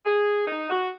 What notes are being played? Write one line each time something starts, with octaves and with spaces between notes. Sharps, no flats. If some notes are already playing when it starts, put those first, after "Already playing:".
G#4
D#4
F#4